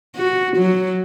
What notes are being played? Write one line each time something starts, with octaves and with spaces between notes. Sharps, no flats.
F#4
F#3